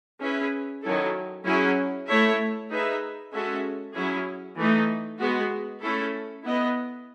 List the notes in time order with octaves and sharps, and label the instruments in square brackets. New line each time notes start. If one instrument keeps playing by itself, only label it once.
[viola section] C#4 E4 G#4 B4 E5
D#3 F#3 C#4 E4 A4
F#3 C#4 E4 G#4
A3 E4 A4 C#5 E5
D#4 G#4 B4 E5
G#3 C#4 F#4 A4 E5
F#3 C#4 E4 G#4
E3 A3 D#4
G#3 B3 F#4
A3 C#4 E4 A4
B3 E4 B4 D#5